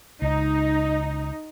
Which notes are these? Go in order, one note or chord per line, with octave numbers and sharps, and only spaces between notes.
C#2 D#4